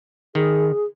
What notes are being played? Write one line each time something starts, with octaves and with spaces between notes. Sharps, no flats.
D#3 G#4